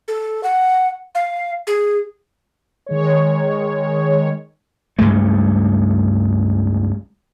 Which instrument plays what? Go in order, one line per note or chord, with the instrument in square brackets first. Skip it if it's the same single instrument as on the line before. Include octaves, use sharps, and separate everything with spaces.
[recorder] A4
F#5
F5
G#4
[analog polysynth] D#3 G#3 C#5
[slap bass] C#2 G2 G#3 A3